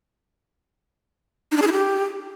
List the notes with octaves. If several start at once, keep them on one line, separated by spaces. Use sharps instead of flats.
D#4
D4
G#4
E4
G4